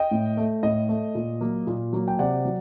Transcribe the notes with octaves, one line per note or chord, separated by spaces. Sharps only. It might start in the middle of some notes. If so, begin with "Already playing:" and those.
Already playing: D#5 G5
A2
A3
A2 D#5
A3
A#2
F#3 A#3
A#2
F#3 A#3
G5
C3 D5 F#5
F#3